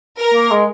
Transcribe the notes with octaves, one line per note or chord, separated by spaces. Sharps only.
A#4
A#3
G#3